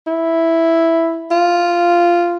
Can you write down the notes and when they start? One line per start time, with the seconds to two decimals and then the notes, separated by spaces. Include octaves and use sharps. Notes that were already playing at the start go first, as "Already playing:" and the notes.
0.07 E4
1.31 F4